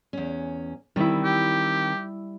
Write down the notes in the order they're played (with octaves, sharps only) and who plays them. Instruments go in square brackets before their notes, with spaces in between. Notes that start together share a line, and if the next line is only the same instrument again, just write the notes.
[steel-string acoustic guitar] E2 C#4
[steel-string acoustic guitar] D#3 C4 [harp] G3 E4
[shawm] G4